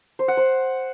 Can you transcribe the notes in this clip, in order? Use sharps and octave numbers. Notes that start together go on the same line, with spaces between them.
C5
F#5
C5